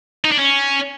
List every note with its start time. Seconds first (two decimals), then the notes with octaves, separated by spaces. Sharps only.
0.24 D#4
0.32 D4
0.39 C#4